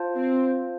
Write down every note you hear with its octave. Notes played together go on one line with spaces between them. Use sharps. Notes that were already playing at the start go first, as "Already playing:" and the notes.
Already playing: F4 C5 F5 A5
C4